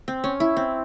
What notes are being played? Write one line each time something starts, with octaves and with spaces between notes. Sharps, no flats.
C4
C#4
E4
C4